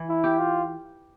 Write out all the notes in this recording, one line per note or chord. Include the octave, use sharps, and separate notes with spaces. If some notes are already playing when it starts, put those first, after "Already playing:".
Already playing: E3
E4
G4
F4